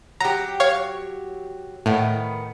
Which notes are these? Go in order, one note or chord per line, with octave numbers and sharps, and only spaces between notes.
F#3 G4 A#5
C#5 F5 C#6
A2 D#3 B3